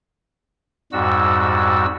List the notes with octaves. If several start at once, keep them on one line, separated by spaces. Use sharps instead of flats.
F2 G#2 G3 F#4 E6